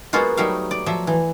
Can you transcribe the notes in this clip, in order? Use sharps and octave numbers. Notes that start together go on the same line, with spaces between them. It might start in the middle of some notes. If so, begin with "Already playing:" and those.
F#3 G#3 A#3 B3 F4 F#4
F#3 G3 A3 D#4 E5 F5
D5
F3 F#3 E5
E3